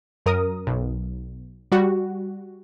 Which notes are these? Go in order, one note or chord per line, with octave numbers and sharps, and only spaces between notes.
F#2 A#4 D#6
B1
G3 F#4